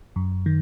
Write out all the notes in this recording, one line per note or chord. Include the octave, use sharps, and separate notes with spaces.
F#2
D#3